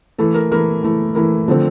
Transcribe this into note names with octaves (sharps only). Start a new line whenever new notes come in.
E3 A3 E4 A4
A#4
E3 A3 E4 A#4
E3 A3 E4
E3 A3 E4 A#4
D3 F3 A3 C4